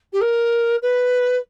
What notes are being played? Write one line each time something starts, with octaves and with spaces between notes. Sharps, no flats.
G4
A#4
B4